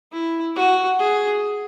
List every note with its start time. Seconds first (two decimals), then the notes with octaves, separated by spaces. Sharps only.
0.12 E4
0.56 F#4
0.99 G#4